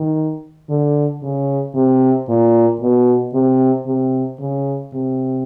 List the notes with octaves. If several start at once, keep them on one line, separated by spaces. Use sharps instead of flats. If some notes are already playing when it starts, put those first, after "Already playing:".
Already playing: D#3
D3
C#3
C3
A#2
B2
C3
C3
C#3
C3